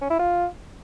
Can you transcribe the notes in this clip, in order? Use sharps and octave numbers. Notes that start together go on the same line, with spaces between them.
C#4
E4
F4